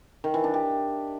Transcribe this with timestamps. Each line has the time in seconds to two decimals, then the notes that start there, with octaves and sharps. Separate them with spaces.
0.24 D#3
0.34 E3
0.44 D4
0.54 G4